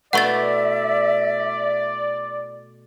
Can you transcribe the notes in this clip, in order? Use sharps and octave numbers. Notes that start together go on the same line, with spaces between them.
B2 A3 E4 D5 E5 F#5 C#6 A6